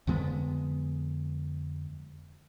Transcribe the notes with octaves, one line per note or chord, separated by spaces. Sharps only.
F2 D3 G#3 B3